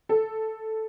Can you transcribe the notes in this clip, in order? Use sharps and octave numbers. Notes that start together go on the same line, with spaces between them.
A4